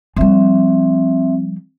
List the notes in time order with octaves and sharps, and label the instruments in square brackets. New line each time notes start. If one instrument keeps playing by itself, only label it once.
[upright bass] F3 G3 [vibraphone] C4 E5